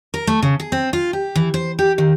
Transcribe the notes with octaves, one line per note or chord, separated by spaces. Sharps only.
A#4
A3
C#3
G#4
C4
F4
G4
E3
C5
G4
D#3